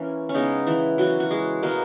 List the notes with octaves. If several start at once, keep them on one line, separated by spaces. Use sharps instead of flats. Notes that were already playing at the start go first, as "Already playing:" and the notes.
Already playing: E3 A#3 C#4
C#4
C#3 G#3 B3 D#4
E3 E4
E3 F#3 A#3 F#4
F#4
G#3 G#4
B2 G#3 A#3 B3 A#4